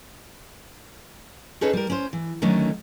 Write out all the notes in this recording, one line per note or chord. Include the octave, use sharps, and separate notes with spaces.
C#4 D#4 G#4 A4 B4 C#5
G3 A#4
C#4 C5
E3
D3 D#3 F#3 A3 C#4 D#4